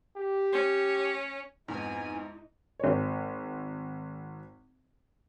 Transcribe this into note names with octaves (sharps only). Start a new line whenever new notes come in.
G4
C#4
F2 G#2 B3 D#4 E4 G#5
G#1 C#5